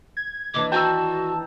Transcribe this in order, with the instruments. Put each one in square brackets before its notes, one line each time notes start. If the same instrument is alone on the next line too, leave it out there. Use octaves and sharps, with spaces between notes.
[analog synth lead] G#6
[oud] D#2 E3 D4 [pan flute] D6
[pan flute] F#4 [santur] G5 A#5 E6 [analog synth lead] A5